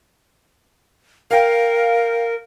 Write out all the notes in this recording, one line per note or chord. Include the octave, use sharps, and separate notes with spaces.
A#4 F5 G5